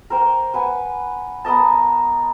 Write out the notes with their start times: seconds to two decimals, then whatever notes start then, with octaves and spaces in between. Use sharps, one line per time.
0.10 A#4 C5 G5
0.54 B4 F#5 G#5
1.45 B3 A#4 D#5 A5